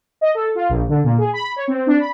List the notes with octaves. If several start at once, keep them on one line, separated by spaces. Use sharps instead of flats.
D#5
A4
F4
A#1
D3
A#2
G#4
B5
C#5
C4
D4
B5